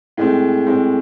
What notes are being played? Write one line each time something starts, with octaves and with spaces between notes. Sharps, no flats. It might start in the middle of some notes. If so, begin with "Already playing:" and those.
A2 G#3 C4
A2 G#3 C4